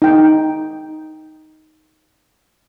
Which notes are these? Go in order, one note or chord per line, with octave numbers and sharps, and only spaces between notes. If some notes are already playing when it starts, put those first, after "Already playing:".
D#4 G5